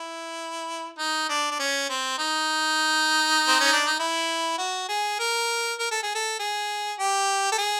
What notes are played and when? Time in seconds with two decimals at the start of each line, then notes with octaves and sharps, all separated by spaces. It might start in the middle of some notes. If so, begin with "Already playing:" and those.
Already playing: E4
0.99 D#4
1.29 D4
1.51 D4
1.59 C#4
1.89 C4
2.19 D#4
3.48 C4
3.60 C#4
3.73 D4
3.87 D#4
3.99 E4
4.58 F#4
4.89 G#4
5.19 A#4
5.79 A#4
5.91 A4
6.03 G#4
6.15 A4
6.39 G#4
6.99 G4
7.52 A4
7.58 G#4